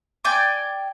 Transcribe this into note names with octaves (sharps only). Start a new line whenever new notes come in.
D5 G5 G#5 D6